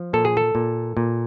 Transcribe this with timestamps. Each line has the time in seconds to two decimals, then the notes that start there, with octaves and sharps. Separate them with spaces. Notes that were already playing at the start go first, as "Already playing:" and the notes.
Already playing: F3
0.13 A#2 A4
0.25 G#4
0.37 A4
0.55 A#2
0.97 A#2